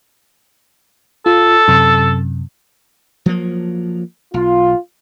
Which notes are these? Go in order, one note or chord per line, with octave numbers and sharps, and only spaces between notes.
F4 A4
F#2 C3
F3 F#3 A#3
B1 F4